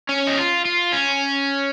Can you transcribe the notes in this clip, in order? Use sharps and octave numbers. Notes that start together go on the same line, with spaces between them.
C#4
D#4
F4
F4
C#4